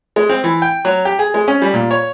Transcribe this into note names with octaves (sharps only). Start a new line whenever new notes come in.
G#3
C4
E3
G5
F#3
G4
G#4
G#3
C#4
G3
A#2
C#5